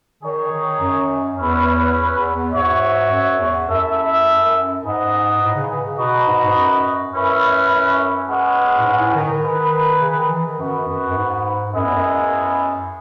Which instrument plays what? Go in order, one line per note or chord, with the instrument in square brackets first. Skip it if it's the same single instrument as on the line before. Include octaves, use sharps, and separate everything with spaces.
[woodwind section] D#3 [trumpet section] D#4 G#4 C#5
[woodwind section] D#3
F#2
[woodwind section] E2 [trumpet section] C#4 E4 B4
[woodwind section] E2
E2
[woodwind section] G#2 [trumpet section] F#4 C#5 E5
[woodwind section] F#2
E2
[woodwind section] F#2 [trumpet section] E4 A4 E5
[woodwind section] F#2
[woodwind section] G#2 [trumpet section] D#4 G#4 B4 D#5 F#5
[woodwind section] A2
C#3
E3
C#3
[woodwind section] B2 [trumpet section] D#4 F#4 B4 D#5
[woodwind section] G#2
G#2
F#2
[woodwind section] F#2 [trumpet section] C#4 E4 B4 E5
[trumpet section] G#3 C#4 G#4 B4 F#5
[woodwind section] A2
G#2
A2
D#3
D#3
[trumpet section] D#4 G#4 B4
[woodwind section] C#3
D#3
E3
D#3
[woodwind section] F#2 [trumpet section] B3 F#4 B4
[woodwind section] F#2
F#2
G#2
[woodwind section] F#2 [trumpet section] G#3 B3 E4 G#4 D#5
[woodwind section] E2
F#2